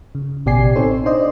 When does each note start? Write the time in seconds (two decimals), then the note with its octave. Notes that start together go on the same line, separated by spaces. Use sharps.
0.15 C#3
0.46 A1 B2 G4 D5 G#5 C7
0.76 C4 D#4 A4 C5 C#5
1.06 D4 C5 D5 D#5